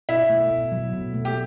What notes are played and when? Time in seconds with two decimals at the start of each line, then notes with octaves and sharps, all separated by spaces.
0.09 B2 E4
0.30 A3
0.50 B2
0.72 F#3
0.93 B2
1.14 A3
1.25 G4